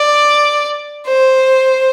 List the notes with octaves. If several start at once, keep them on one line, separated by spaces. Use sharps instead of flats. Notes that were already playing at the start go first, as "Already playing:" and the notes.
Already playing: D5
C5